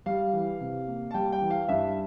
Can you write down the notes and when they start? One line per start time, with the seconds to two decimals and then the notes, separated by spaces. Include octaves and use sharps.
0.06 G3 F5
0.33 E3
0.60 C3
0.88 A#3
1.11 A5
1.14 G3 G5
1.32 G5
1.41 E3
1.50 F5
1.68 G2 E5